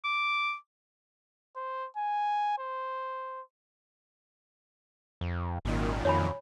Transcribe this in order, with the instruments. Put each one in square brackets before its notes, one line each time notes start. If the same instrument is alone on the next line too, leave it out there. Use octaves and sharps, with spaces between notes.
[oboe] D6
[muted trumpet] C5
G#5
C5
[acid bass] F2
[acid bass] G#1 [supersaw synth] F#2 A#2 D#3
[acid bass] F2 [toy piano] C#5 G#5 B5